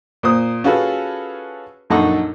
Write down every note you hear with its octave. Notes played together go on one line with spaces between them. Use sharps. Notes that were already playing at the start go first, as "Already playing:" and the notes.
A#2 C5 D#6
C#4 F4 F#4 G#4 A4 B4
A#1 F#2 D#4 A4 F#5 C#6